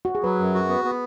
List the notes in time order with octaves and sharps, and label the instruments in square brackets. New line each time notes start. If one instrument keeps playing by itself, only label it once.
[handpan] F#4
G#4
[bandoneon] F#3 [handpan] B4
[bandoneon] F#2
F#4
B3
B3